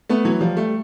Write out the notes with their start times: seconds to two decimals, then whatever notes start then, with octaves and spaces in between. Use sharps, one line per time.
0.09 A3 B3
0.25 E3 F#3
0.41 F3 G3
0.57 G3 A3